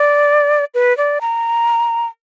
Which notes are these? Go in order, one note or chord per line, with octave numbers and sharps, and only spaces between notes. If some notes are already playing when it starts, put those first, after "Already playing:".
Already playing: D5
B4
D5
A#5